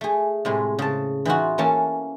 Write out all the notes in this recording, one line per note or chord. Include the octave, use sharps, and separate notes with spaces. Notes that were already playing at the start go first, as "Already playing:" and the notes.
A3 G#4
A2 C3 G#3
C#3 A5
E3 D#4 F4 F#4
E3 A#3 C#4 A4 A5